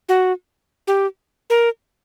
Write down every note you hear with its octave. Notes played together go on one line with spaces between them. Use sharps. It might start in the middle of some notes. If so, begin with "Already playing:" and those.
F#4
G4
A#4